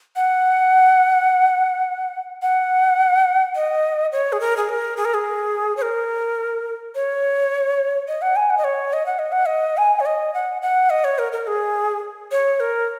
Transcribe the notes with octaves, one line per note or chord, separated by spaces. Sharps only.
F#5
F#5
D#5
C#5
G#4
A#4
G#4
A#4
G#4
A#4
G#4
C#5
A#4
C#5
D#5
F#5
G#5
F#5
D#5
C#5
D#5
F#5
D#5
F#5
D#5
G#5
C#5
D#5
F#5
F#5
D#5
C#5
A#4
A#4
G#4
C#5
A#4